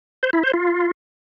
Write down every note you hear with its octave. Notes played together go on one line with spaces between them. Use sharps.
C5
E4
C5
F4